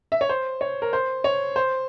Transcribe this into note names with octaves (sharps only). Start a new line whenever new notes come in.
E5
C#5
C5
C#5
A#4
C5
C#5
C5